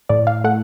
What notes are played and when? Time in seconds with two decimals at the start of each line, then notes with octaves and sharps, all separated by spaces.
0.09 A2 D5
0.27 F5
0.44 A3 F#5